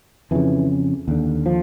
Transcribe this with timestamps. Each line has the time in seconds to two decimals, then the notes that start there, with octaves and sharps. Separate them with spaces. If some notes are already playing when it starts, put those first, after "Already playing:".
0.31 F2 C#3 E3
1.08 D#2 D3
1.46 F3